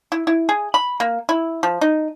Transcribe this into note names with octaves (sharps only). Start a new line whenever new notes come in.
E4
E4
G#4
B5
A#3
E4
F3
D#4